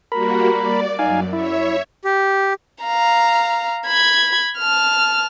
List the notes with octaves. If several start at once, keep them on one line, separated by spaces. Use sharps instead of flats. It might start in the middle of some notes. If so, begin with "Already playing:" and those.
G3 A#3 F#4 A#4 B5
D5
F#2 D#4 F5 G#5
E4 C#5 E5
G4
F5 A#5
B5 G#6
A5 F6